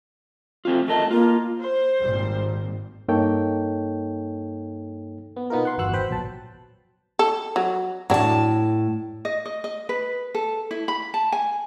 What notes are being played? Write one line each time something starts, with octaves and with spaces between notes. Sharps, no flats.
A3 C4 F4
A3 A#4 D#5 A5
A#3 F4
C5
G#1 A#2 G3
G2 A#3 D#4 A4 C#5 G5
B3
B2 B3 D#4 F4 A#4
F#5 C6
G1 E2 F#4 F#5 E6 F#6
G#1 B4 C5 G5 B5
A#1 B2 F#3 A5
A4
F#3
A2 F#3 D4 A5
D#5
D#5
D#5
B4
A4
E4
B5
A5
G#5